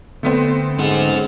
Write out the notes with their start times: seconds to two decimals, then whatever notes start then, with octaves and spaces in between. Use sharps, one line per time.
0.23 D3 A3 B3 C4
0.79 G#2 C#4 F#5